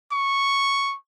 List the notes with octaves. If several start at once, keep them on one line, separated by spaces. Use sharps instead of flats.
C#6